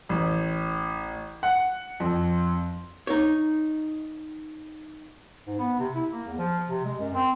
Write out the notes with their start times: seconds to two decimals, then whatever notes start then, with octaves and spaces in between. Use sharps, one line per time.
0.09 A1
1.43 F#5
2.00 F2
3.07 D#4 C#5
5.47 G#2
5.59 B3
5.79 C3
5.95 E4
6.11 A#3
6.27 E2
6.38 F3
6.68 C3
6.85 G#3
7.00 F#2
7.15 C4